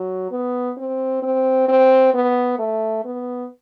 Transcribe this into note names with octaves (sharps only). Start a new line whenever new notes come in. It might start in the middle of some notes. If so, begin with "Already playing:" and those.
Already playing: F#3
B3
C4
C4
C4
B3
A3
B3